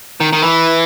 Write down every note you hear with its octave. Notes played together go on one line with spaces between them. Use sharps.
D#3
D#3
E3